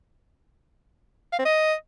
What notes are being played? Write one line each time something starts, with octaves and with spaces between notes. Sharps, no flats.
F5
C4
D#5